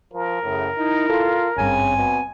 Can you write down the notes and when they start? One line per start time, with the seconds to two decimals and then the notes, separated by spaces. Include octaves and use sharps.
0.13 F3 A#4
0.43 F#2 A2 C#3
0.77 D#4 E4
1.10 F4 A4
1.57 G#1 G2 C#3 C4 G#5
1.97 B2